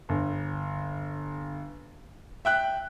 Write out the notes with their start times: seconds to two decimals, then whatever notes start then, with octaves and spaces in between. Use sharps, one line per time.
0.09 G1
2.45 E5 G5 F#6